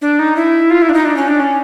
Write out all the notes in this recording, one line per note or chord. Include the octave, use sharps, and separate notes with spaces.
D4
D#4
E4
F4
E4
D4
D#4
D4
C#4
D4
C#4